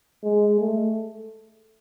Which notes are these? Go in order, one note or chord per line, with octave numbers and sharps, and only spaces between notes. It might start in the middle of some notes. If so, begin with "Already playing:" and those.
G#3
A3